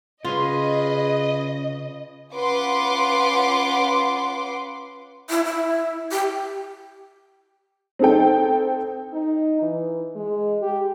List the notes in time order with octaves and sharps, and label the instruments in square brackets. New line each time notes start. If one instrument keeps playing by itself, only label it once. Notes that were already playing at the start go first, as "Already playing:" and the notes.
[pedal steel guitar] C#3 [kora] F4 [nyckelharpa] G#4 B4 [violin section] D#5
[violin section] C#4 F4 B4 F#5 C6 D6
[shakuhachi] E4
E4
G4
[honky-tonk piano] C4 D#4 A4 G5
[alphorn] D#4
E3
G#3
G4